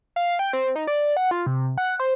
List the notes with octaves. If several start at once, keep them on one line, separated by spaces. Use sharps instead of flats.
F5
G5
C4
D#4
D5
F#5
F4
C3
F#5
C5